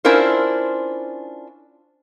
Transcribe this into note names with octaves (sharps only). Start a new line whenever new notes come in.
C#4 D4 E4 F4 A#4 C5